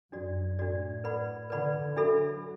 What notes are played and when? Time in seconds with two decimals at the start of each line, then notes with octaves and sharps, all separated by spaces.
0.12 F#2 D4 F#4 D5
0.59 A2 D4 F#4 D5
1.04 B4 D5 F#5 B5
1.50 D3 B4 D5 F#5 B5
1.96 F#3 D4 F#4 A4 E5 B5